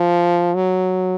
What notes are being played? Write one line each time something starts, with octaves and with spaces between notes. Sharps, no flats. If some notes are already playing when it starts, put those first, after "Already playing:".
Already playing: F3
F#3